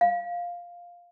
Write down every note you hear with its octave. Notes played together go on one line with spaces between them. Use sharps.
F5